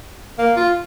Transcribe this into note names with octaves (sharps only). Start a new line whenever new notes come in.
A#3
F4